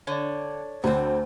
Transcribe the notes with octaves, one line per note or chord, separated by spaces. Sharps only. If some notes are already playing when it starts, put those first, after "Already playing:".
D3 C#5 D5
D2 D3 C4 C5